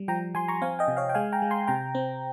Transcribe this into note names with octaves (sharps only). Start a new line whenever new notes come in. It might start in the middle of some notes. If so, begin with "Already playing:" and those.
Already playing: G3
F3 G5 A#5
F3 G#5 C6
A#5 C#6
C4 F5 G#5
D#5 G5
C3
C#5 F5
G5
G#3 F5 G#5
G5 A#5
G#3
G#5 C6
C3 G5 A#5
C4